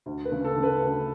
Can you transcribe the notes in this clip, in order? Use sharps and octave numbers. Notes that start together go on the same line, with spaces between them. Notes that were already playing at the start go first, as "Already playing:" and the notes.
D2
B4
C#3
A4
C#3
B4
D2